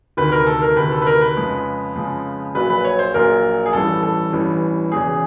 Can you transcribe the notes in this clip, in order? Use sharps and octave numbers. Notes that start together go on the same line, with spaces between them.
D2 C3 D#3 B4
A#4
A4
A#4
D2 C3 D#3 B4
A4
B4
A#4
B4
F2 C#3 F3 G#3
F2 C#3 F3 G#3
A#1 A#2 F#3 B4
B4
C#5
C5
A#1 A#2 F#3 A#4
G#4
A1 G2 E3 A4
A4
A1 G2 E3
E1 E2 C#3 G#4